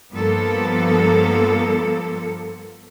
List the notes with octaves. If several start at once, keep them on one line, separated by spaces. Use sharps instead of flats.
G2 F3 A#3 B3 A4